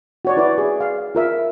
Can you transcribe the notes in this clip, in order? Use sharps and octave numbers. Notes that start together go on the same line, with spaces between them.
F#4 C#5 D5
E4 B4 C#5 D5
G#4
F5
F4 A#4 E5